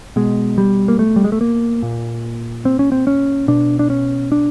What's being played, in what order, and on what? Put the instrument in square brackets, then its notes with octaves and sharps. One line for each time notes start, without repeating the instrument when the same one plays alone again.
[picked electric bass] B2 G#3
G3
A#3
A3
G3
G#3
A3
A#3
A#2
C4
C#4
C4
C#4
B2 D4
D4
C#4
D4